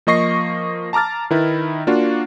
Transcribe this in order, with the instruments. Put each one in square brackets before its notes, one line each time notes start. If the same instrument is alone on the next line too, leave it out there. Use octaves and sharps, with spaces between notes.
[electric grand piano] F3 A#3 D#5 C#6 A#6 C7
A5 A#5 D6 F6 A6
D#3 D#4 E4 B4
A#3 D4 F4 F#4